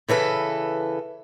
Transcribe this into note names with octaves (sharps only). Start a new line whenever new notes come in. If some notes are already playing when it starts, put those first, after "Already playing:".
C#3 E3 A4 B4